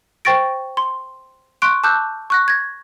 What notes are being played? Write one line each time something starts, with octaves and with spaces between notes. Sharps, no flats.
C5 G5 C#6 A6 A#6 D7
C6
C6 C#6 F#6 D7
A5 D6 E6 F#6 G6
C#6 F#6 A#6
G#6 A#6